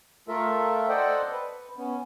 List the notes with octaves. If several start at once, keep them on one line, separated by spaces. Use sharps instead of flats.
A3 F4 A4 A#4 E5
A4 C5 D5 D#5 F#5 G5
B4
B3 C#4